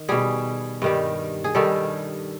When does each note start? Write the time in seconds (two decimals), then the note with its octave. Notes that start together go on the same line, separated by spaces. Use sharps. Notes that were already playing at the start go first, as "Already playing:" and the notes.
Already playing: D#3
0.09 B2 G3 G#4
0.82 G2 D#3 G3
1.44 G#4
1.55 G2 D#3 G3 A4